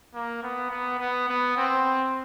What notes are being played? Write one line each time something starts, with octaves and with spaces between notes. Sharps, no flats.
A#3
B3
B3
B3
B3
C4